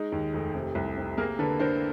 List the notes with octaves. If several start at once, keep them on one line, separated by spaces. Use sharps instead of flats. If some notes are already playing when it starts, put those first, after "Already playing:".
Already playing: G#3 D#4
D#2
F1
C3
C2
C3
A#3 G#4 A#4
D3 A4 B4
D3 A#4 C5